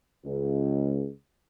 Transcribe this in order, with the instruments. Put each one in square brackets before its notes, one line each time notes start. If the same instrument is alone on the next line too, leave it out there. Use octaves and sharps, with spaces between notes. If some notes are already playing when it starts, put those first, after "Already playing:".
[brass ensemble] C#2